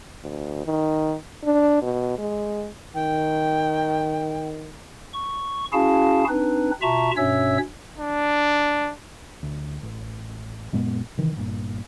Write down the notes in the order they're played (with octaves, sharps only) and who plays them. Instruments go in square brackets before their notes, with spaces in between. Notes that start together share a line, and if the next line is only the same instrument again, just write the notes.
[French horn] D2
D#3
D4
B2
G#3
[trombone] D#3 [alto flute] G5
[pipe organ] C#6
C#4 E4 F#4 G#4 F5 A5
C4 D4 D#4 B4
B2 F4 E5 A5 A#5 C#6
G2 B2 C#4 C#5 E5 E6
[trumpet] D4
[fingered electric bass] D2
A1
F#2 A#2 G#3 B3
C3 D#3 E3
G1 G2 A#2